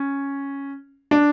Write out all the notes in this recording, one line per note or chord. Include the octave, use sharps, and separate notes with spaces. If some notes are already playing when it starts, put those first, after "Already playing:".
Already playing: C#4
D4